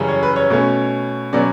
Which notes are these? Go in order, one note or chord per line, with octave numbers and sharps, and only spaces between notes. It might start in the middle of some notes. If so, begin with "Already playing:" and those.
Already playing: F#2 C#3 E3 G3 C#4
C#5
B4
C#5
B2 A3 C#4
B2 F#3 C#4 D5